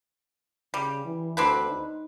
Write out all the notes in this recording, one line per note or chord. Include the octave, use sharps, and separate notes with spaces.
C#3 G3
E3
D2 C4 D4 B4
D#4